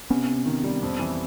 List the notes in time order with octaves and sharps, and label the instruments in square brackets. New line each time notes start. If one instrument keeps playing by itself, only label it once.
[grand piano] C3 [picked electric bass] B3 C#4
[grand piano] C3
D#3
G3
F2
E3